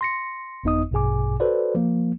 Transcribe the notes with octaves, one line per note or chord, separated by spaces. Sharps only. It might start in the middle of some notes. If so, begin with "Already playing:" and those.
C6 A#6 C#7
G1 F2 B3 D#4 D#5 D#6
A#1 G2 B2 G#4 G#5 D6
F#4 A4 B4 C5 D5
F3 A#3